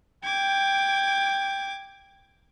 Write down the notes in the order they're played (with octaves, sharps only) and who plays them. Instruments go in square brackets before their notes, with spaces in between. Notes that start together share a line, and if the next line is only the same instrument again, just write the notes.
[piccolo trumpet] G5 [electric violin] D6 G#6